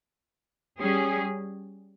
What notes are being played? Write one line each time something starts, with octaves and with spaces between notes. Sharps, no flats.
G3 C#4 G#4